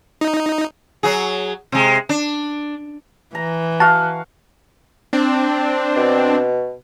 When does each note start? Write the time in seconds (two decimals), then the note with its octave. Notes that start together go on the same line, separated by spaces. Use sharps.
0.21 D#4
1.03 F#3 F#4 G#4
1.72 C3 G#3
2.09 D4
3.35 E3 A#5
3.80 F#4 F5 A5
5.13 C4 D4
5.96 B2